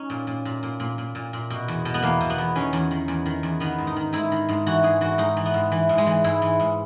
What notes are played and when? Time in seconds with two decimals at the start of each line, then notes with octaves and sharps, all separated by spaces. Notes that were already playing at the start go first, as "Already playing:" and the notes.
Already playing: C#4 D#4
0.10 A#2
0.27 A#2
0.45 A#2
0.63 A#2
0.80 A#2
0.98 A#2
1.15 A#2
1.33 A#2
1.50 B2
1.68 E2
1.85 B2
1.94 B3
2.02 E2 A#3
2.21 B2
2.30 B3
2.38 E2
2.55 D#3 C#4
2.73 E2
2.91 D#3
3.08 E2
3.26 D#3
3.43 E2
3.60 D#3 B3
3.78 G#2
3.87 D#4
3.96 D#3
4.13 G#2 E4
4.32 D#3
4.49 G#2
4.66 E3 F#4
4.83 G#2 G#4
5.01 E3 F#4
5.18 G#2 D#4
5.37 E3
5.45 B3
5.54 G#2
5.72 E3
5.89 G#2
5.98 G#3
6.06 E3
6.24 G#2 E4
6.42 E3
6.60 G#2